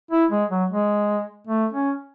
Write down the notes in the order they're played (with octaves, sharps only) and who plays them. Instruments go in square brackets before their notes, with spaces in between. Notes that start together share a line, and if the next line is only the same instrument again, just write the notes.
[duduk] E4
G#3
F#3
G#3
A3
C#4